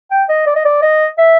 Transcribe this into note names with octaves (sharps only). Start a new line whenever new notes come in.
G5
D#5
D5
D#5
D5
D#5
E5